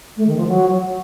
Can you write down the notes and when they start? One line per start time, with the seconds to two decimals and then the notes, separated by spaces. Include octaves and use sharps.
0.17 A3
0.27 D#3
0.37 F3
0.47 F#3